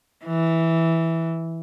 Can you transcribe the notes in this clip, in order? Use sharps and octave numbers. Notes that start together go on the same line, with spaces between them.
E3